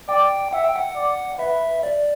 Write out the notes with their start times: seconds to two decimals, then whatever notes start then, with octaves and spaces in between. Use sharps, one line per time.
0.08 D5 G5
0.53 E5 F#5
0.64 G5
0.76 F#5
0.95 D5
1.39 B4 E5
1.83 D5